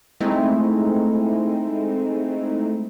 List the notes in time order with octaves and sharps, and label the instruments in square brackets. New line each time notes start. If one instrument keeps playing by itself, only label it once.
[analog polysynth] G#3 A3 C4 D#4 E4